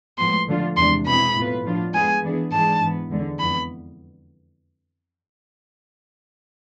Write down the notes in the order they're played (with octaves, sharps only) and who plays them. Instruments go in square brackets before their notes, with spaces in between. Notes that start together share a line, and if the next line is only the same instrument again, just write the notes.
[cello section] A2 F3 G#3 B3 [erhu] C6
[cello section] D3 F3 A3 D4 F4
[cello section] E2 C3 G#3 D4 [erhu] C6
[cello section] B2 G#3 C4 E4 G#4 [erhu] B5
[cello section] A2 F3 B3 F4 B4
A2 F3 B3 D4 F4
[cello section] G#3 B3 F4 G#4 [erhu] G#5
[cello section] E3 B3 D4 G#4
[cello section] G#2 E3 G#3 D4 G#4 [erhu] A5
[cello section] G#2 E3 B3
E2 D3 G#3
[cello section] F2 E3 B3 [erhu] B5